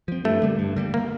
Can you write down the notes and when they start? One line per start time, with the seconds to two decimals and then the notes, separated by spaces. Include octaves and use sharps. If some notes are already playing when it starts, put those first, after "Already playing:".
0.08 F3 C4
0.25 G2 A3
0.42 D3 G3 A#3
0.59 G2
0.76 D3 G3 A#3
0.94 A#3